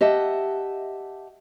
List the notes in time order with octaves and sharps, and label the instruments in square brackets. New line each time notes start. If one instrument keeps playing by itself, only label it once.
[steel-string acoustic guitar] G4 D#5 E5 F#5 A5